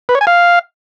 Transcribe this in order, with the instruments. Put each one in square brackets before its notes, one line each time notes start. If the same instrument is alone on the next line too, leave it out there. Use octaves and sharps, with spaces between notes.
[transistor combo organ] B4
C#5
G#5
F5